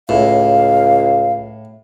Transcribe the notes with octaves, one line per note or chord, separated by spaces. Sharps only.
C#2 A2 F5